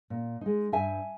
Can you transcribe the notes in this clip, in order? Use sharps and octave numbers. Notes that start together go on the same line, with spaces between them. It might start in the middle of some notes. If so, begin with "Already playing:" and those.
A#2
G#3 D#4
G2 E5 G#5